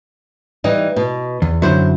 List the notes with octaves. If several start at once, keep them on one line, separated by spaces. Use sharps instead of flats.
E3 G3 D#4
B2
E2
F#2 D3 F#3 E4 C5